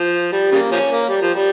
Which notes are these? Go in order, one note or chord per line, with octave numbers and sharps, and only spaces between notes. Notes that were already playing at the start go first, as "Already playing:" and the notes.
Already playing: F3
G3
C#3 G3 A#3
F3 A#3 C#4
A#3
G3
F3
G3